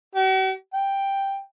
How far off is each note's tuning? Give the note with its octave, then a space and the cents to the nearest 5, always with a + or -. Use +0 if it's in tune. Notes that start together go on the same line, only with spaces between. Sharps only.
F#4 +45
G5 +5